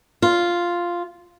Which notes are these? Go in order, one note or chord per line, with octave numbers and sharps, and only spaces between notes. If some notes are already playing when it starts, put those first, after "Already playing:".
F4